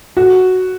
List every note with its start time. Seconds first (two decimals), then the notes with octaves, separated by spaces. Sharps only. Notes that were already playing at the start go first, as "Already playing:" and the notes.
0.17 F#4